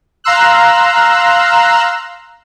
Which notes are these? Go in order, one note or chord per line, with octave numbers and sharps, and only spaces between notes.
F5 A#5 C6 E6 F#6